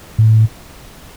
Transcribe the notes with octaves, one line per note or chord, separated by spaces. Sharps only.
A2